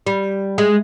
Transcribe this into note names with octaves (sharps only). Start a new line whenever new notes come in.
G3
G#3